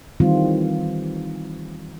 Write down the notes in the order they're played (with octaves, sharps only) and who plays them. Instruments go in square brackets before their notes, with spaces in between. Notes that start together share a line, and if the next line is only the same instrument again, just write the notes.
[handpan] D#3 E3 G3 C4 F4